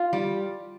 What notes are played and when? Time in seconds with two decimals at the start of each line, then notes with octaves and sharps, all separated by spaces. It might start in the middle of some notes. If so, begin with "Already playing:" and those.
Already playing: F4
0.13 G3